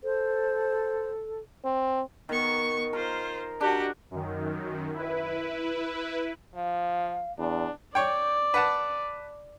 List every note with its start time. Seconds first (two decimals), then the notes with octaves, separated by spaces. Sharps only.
0.03 A4 C5
1.65 C4
2.29 D#3 B3 C#6
2.93 F4 A#4 C5
3.61 D4 F#4 G4
4.11 F#2 D#3
4.94 E4 B4
6.55 F3 F5
7.39 E2 D4
7.95 C#5 D5 G5
8.54 B4 F#5 A5